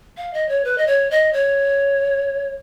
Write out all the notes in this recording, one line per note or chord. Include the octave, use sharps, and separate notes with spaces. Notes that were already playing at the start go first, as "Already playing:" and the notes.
F5
D#5
C#5
B4
D#5
C#5
D#5
C#5